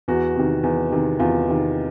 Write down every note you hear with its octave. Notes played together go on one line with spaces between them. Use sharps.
E2 F#4
C3 D#3
E2
C3 D#3
E2 F4
C3 D#3